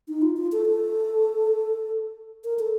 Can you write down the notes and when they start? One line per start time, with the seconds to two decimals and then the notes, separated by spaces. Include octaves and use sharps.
0.08 D#4
0.22 F4
0.37 F4
0.52 A4
0.67 A4
2.44 A#4
2.59 A4